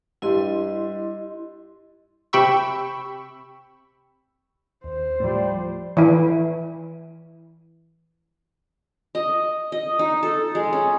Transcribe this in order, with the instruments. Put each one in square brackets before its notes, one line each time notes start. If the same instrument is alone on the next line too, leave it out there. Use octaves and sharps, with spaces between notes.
[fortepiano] G2 G3 [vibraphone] E4 D#5 C6
[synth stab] C3 G4 G5 B5 C#6 E6
[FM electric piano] D#2 [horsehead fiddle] C5
[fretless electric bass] A2 F3 [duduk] G3 [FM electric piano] A3
[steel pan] E3 E4
[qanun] D#5
D#5
D#4
A4
G#3
C#4